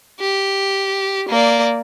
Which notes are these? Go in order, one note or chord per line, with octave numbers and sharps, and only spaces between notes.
G4
A#3 D5